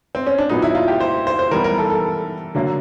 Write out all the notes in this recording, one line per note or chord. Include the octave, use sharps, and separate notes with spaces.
C4
C#4
D4
A#2 F#3 B3 D#4
E4
F4
G4
C5
C5
C5
E3 G3 B3 A#4
A#4
A4
A4
D3 F#3 A#3